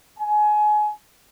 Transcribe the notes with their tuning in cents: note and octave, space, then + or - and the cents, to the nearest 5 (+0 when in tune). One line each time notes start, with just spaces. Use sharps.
G#5 +25